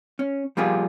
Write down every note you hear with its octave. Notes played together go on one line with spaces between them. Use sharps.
C#4
F3 G3 A#3 F4 G#4